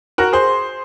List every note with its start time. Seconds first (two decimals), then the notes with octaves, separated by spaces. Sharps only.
0.18 F#4 A#4
0.33 G#4 C5